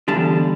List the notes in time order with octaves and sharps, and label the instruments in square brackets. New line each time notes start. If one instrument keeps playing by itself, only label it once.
[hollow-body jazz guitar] E2 D3 G3 A5